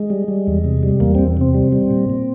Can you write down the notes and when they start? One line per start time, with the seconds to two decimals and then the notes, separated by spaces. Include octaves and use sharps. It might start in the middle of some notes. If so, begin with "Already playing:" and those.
Already playing: G#3
0.10 G3
0.28 G3
0.47 E2
0.64 C3
0.83 G3
1.00 E2 A#3
1.15 E2 C4
1.37 C3 C4
1.55 G3
1.72 G3
1.91 A#2
2.10 A#2